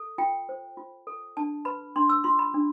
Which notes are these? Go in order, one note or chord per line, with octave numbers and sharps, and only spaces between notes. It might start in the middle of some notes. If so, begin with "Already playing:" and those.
Already playing: A4
F4 G5
C5
F4
A4
D4 A5
B4 B5
D4 C6
E6
F4 C6
B5
D4